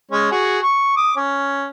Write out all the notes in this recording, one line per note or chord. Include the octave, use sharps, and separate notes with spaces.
G#3 C#4
F#4 G#4
C#6
D6 D#6
C#4